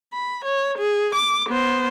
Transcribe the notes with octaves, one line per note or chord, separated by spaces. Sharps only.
B5
C#5
G#4
D6
B3 C5